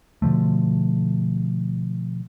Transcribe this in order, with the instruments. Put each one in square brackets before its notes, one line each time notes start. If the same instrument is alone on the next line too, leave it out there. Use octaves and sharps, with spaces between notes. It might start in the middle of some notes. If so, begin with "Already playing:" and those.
[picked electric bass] B2 D3 F3 A3